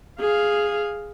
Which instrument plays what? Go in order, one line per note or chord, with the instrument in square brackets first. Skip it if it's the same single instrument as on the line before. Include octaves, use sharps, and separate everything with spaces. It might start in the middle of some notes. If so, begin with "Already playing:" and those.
[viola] G#4 F5